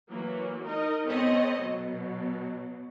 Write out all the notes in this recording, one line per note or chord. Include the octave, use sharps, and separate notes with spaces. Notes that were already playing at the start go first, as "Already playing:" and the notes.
E3 F#3 A#3
D#4 A#4 D#5
B3 C4 A4 C#5 D#5
B2 F#3